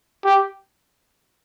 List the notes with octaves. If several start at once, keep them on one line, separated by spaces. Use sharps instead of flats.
G4